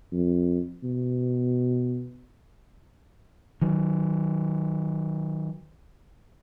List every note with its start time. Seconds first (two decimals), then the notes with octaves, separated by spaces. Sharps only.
0.12 F2
0.83 B2
3.62 D#3 F#3